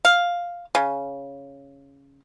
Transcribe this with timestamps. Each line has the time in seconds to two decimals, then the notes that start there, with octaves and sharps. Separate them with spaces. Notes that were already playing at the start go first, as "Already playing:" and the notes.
0.05 F5
0.75 C#3